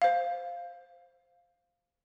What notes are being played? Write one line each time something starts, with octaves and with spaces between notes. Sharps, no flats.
C5 F5